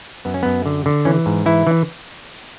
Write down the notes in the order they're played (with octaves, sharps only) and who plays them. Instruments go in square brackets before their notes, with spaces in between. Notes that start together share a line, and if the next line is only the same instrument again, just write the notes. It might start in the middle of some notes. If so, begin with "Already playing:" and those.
[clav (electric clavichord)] F#2 B3
C#4
F#2 B3
D3
D3
E3 C#4
G#2
E3 E4
E3